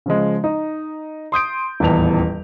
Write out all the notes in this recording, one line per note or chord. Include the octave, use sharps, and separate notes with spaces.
C#3 F3 G#3
D#4
C6 D#6 G6 D7
D#1 A1 E2 A5 F7